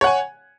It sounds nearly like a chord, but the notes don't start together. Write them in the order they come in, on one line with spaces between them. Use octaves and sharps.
C#5 F#5 G#5